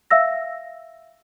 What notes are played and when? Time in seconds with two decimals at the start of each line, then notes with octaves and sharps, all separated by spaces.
0.11 E5 F5 E6 A#6